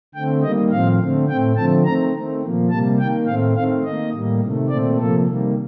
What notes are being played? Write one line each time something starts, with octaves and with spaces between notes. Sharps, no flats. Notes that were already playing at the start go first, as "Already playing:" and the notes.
D3 A3 C4 G5
D#3 G3 A#3 D#5
A2 F3 C4 F5
D3 A3 C4
A2 A3 C4 G5
D3 F3 A3 C4 A5
D#3 A3 C4 A#5
D#3 A3 C4
A#2 F3 A#3
C3 G3 A#3 A5
D#3 A#3 G5
A2 A3 C4 F5
D#3 A3 C4 F5
D#3 A#3 D#5
A2 G3 A#3
C3 D#3 A3
A#2 A3 C4 D5
C3 F3 A#3 A4
C3 D#3 G3 A#3